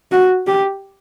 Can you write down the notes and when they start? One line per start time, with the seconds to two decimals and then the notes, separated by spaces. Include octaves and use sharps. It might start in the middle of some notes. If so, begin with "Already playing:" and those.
0.12 F#4
0.47 G4